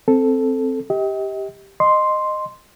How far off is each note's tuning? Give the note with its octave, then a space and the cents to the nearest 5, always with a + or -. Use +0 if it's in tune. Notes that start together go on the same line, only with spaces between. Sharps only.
C4 +0 A4 +0
G4 +0 D#5 +40
D#5 -15 C6 +0